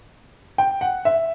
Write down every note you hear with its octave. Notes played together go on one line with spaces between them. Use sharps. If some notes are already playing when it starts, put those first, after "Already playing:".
G5
F#5
E5